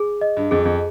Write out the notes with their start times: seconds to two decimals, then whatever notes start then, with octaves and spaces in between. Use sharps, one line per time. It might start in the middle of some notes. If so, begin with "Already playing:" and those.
Already playing: G#4
0.21 D#5
0.37 G2
0.51 F2 G#4
0.65 F2